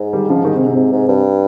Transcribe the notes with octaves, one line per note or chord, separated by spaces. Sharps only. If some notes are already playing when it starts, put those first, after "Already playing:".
Already playing: G#2
D#3 G3
C#3 F3
D#3 G3
C3
C3
G#2
G#2
G2